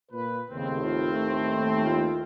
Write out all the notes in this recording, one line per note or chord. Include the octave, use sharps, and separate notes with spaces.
A#2 B4
D#2 A2 C#3 C4
F4
A3
F4